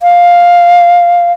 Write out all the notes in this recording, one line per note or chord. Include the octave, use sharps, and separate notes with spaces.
F5